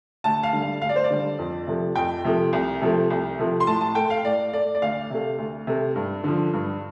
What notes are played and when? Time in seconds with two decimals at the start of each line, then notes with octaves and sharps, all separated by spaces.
0.24 D2 A5
0.43 F5
0.53 D3 G3
0.62 F5
0.81 D2 F5
0.89 D5
0.96 C5
1.04 D5
1.10 D3 G3
1.39 F2
1.67 C3 F3 A3
1.95 F2 G5
2.24 C3 F3 A3
2.53 C2
2.81 C3 F3 A3
3.10 C2
3.39 C3 F3 A3
3.60 C6
3.67 A2 A5
3.81 A5
3.95 A3 G5
4.10 F5
4.24 A2 D5
4.53 A3 D5
4.75 D5
4.82 D2 F5
5.10 C3 A3
5.38 D2
5.67 C3 A3
5.96 G2
6.24 D3 F3
6.53 G2